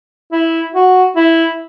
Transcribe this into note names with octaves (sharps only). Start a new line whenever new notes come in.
E4
F#4
E4